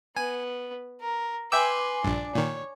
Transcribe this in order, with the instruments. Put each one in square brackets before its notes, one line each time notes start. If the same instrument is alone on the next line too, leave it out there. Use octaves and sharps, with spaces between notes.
[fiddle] B3 [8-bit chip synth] G#5
[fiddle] A#4
[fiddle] B4 C6 [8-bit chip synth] E5 G5 E6 [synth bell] G#5 D6
[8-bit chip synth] A#1 G2 [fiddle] D4
[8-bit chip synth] A#2 D#3 [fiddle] C#5